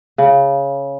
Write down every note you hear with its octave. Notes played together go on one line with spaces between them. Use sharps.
C#3